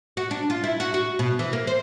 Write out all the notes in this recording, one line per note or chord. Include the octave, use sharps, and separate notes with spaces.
F#4
D4
F4
E4
F#4
F#4
B2
E3
A#3
C5